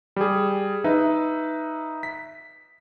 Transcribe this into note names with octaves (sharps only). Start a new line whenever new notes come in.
G3 G#4
D#4 B4 E5
B6